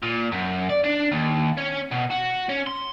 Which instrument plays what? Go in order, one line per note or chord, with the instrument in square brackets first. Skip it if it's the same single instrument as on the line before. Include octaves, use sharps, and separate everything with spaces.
[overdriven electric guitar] A#2
F#2
D5
D4
D#2
C#4
B2
F#4
C#4
C6